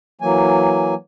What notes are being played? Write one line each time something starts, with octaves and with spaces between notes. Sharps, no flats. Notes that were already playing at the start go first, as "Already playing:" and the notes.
E3 F#3 A#3 G#5